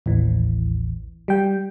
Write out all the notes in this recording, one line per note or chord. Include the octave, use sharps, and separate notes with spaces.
A1 D#2 E3
G3 G5